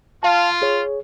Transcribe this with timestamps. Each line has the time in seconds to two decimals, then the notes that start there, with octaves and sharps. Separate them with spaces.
0.23 F4 F5 A5
0.62 G#4 C#5